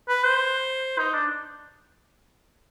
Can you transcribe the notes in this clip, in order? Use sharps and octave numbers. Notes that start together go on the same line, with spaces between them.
B4
C5
D#4
D4